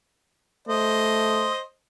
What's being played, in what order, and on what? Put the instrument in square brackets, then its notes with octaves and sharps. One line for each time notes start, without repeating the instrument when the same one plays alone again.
[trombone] A3 [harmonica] C5 D#5